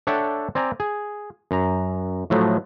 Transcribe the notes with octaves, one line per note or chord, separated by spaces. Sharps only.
D4 A4 C#5 E5 F#5 G5
C4 D5 G#5 A#5
G#4
F#2 A#5
A2 F3 F#3 A3